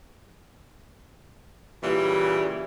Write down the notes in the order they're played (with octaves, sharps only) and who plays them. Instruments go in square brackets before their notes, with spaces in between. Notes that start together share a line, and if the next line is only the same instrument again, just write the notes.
[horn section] A#2 C#3 E3 G3